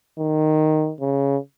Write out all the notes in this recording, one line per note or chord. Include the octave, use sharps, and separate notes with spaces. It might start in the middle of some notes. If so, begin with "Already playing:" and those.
D#3
C#3